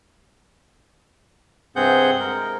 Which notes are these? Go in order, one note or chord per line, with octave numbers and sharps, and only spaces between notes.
G2 C3 C4 G#4 F#5 G6
G#3 A#4